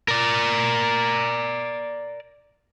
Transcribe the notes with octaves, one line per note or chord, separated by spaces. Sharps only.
A#4 D5